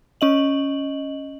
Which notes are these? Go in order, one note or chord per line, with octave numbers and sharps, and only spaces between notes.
C#4 D#5 F#7